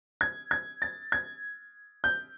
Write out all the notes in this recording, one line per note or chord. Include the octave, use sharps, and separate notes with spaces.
G#6
G#6
A6
G#6
G6